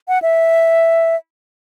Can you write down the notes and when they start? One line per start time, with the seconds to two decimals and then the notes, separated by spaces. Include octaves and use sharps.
0.08 F#5
0.22 E5